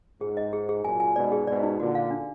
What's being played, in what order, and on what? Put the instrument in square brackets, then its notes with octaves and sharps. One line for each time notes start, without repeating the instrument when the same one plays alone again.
[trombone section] G#2 [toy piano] G#4
[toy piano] D#5
G#4
G#4
[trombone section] F#2 A#2 [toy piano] G#5
[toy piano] G#5
[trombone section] G#2 B2 [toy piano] D5
[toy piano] G#4
[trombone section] G#2 B2 [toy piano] D5
[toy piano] D#4
[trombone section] A#2 D3 [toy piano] F#4
[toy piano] F5
D4